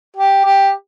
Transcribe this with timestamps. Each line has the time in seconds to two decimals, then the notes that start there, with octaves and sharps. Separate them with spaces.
0.16 G4
0.45 G4